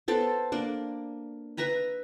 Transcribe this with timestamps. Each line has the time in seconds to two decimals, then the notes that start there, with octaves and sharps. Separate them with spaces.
0.08 B3 A4 C5
0.52 A#3 D4
1.57 B4 E5 A#5 B5